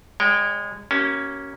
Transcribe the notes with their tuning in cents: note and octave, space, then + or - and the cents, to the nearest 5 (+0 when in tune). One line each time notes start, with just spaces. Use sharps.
G#3 -20 C#5 +20 G5 +0
A#3 +10 C#4 +5 G4 -45